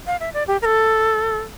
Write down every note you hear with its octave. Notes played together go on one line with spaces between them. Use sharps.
F5
E5
D5
G4
A#4
A4